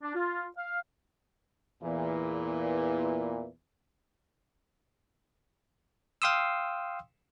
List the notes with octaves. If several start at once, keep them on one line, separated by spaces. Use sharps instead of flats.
D4
F4
F5
E2 A#2 E3
F5 G5 C6 D#6 E6